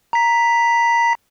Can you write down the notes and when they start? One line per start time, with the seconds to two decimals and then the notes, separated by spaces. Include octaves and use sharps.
0.13 A#5 B6